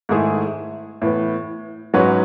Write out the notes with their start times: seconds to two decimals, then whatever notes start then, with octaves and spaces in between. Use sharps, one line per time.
0.09 G#2 D#3 A3 E4 G#4
1.02 A2 E3 B3
1.94 G#2 F#3 C#4 F#4 B4